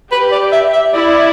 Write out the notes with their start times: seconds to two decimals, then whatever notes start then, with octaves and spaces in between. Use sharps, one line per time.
0.12 G4 B4
0.32 D5
0.52 E5
0.73 E5
0.93 E4 D5